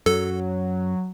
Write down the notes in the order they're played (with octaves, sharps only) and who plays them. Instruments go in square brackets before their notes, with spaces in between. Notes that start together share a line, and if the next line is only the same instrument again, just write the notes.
[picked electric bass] F#2 [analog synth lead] F#3 [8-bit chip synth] A4